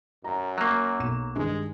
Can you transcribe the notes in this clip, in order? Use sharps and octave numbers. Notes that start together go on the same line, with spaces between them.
F#2 A#5
F#3 A#3
B1 E7
G2 D#3 G#3